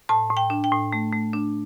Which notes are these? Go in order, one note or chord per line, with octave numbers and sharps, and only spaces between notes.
A2 A5
A2
G5
D4
G5
A2
A3
A3
D4